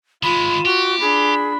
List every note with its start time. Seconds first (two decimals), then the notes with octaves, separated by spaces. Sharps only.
0.23 D#3 G#3 F4 B5
0.65 F#4 G4
1.01 D4 G#4 B5